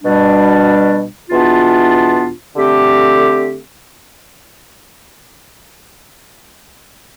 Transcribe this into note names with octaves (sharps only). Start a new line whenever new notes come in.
B2 G3 D4
E2 B2 B3 D4 F4
D3 A3 C4 G4